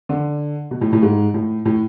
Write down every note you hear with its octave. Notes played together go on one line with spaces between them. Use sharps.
D3
B2
A2
A2
G#2
A2
A2